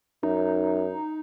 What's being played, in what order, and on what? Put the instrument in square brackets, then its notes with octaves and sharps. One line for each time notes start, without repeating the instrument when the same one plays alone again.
[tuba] F#2 [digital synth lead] D#4